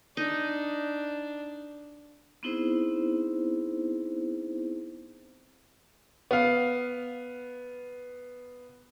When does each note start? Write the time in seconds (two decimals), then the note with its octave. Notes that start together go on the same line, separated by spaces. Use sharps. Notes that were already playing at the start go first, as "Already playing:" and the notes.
0.17 D4 D#4 D#5
2.43 B3 C4 D#4 E4 G#4 C5
6.31 B3 F5